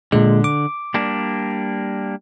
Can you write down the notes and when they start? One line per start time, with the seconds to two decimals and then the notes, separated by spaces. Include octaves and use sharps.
0.12 A#2 D3 G#3
0.44 D6
0.94 G3 A#3 D4